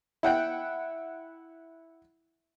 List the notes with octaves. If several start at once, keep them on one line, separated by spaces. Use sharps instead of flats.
E4 F#5 G5